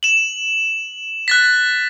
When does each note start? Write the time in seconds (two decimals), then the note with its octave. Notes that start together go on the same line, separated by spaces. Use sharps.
0.03 E7 F#7
1.28 F#6 A6 B6